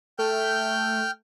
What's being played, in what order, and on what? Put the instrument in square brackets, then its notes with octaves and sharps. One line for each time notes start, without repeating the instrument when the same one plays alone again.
[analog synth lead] A3 [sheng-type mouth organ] G5 F6 G6